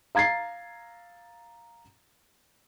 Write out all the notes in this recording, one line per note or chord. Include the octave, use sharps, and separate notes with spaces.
F5 A#5 G#6 A6 C7